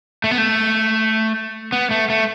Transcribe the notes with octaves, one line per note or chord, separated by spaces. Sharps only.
A3
B3
A3
B3
A3
A3